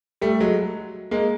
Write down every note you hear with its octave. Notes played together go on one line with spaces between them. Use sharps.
G3 A3
F#3 G#3
G#3 A#3